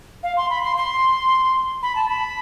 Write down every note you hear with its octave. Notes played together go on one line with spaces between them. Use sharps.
F5
C6
B5
C6
C6
B5
A5
B5